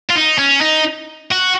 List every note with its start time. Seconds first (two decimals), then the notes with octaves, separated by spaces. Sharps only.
0.10 F4
0.15 D#4
0.38 C#4
0.61 D#4
1.31 F#4